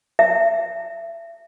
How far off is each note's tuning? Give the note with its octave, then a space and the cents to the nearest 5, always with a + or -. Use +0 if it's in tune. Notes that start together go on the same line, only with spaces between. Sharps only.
E5 +30